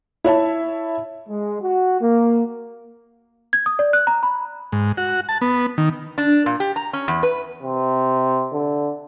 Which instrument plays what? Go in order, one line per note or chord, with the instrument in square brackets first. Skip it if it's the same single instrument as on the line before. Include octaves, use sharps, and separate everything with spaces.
[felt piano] E4 C#5 E5 A5
[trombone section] G#3
F#4
A#3
[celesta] G#6
D#6
D5
F#6
A#5
B5
[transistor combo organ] G#2
F#4
A5
B3
D#3
[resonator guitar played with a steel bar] D4
A#2
G4
A#5
C#4
E2
B4
[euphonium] C3
D3